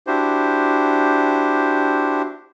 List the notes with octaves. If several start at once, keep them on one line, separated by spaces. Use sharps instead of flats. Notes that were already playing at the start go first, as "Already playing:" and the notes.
D4 E4 F#4 G4 C5